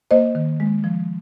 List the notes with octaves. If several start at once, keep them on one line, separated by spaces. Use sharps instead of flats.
A#3 C5 D#5
D#3
G#3
F3